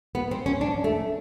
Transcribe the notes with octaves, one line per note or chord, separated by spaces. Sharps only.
B3
C4
C#4
D4
A3